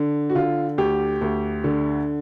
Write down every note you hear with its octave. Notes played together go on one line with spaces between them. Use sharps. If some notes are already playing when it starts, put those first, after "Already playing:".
Already playing: D3
F#4
D3 F4
D2 G4
D2
D3